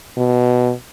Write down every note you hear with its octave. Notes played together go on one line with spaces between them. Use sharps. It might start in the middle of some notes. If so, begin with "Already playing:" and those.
B2